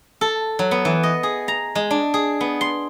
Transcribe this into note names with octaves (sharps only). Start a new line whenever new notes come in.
A4
F#3
B3
E3
D#5
G#4
A#5
G#3
D4
G#4
B3
C6